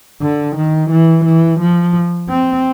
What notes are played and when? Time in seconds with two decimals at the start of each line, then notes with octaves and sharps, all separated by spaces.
0.21 D3
0.56 D#3
0.90 E3
1.25 E3
1.60 F3
2.29 C4